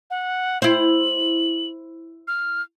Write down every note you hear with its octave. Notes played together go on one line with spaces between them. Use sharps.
F#5
E4 C5 F#7
F6